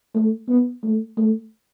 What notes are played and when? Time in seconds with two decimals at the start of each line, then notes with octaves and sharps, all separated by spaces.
0.15 A3
0.49 B3
0.83 A3
1.17 A3